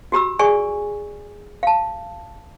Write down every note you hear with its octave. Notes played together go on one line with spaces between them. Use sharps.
F#4 G4 B5 E6
G#4 D5 G#5 C#6
F5 A5